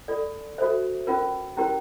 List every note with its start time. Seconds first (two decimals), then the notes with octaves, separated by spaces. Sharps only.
0.08 F4 A4 D5
0.58 F#4 A4 C5 E5
1.07 C#4 F4 A#4
1.57 C#4 E4 G4 A#4